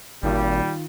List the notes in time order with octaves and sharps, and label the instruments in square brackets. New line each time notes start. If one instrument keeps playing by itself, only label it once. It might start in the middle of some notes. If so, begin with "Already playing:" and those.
[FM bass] G#1 [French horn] A#2 [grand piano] D#3 F4 [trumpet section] G3